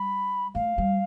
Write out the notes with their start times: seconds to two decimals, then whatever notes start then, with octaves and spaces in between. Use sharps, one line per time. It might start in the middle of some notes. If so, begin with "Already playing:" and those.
Already playing: G3 B5
0.55 A3 F5
0.78 G3